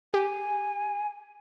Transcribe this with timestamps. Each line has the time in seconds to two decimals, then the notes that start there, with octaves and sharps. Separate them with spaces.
0.14 G4 G#5